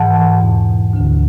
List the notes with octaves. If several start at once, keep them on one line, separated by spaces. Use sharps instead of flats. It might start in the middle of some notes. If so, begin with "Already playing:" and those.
Already playing: G#2 E3 F#5 A5
E2 B2
D2 D3